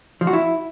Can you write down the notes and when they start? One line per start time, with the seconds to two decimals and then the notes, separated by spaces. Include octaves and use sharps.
0.21 F3
0.27 F#4
0.33 E4